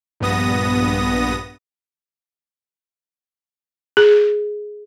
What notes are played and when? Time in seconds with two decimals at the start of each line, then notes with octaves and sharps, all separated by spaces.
0.20 A#1 G2 B3 D#6 A#6
3.97 G#4